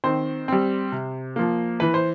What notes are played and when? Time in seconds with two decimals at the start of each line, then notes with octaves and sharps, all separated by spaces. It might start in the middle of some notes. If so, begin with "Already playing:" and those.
0.04 D#3 C4 C5
0.48 G3 C4
0.92 C3
1.36 F3 A#3
1.80 E3 B4
1.94 C5